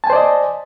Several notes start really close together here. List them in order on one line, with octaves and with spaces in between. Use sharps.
A5 G#5 C5 D5 D#5